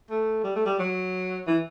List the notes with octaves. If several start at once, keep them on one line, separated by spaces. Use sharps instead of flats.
A3
G3
A3
G3
F#3
E3